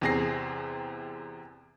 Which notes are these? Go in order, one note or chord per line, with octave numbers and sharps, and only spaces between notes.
E2 C3 C4 G#4 A#6 C7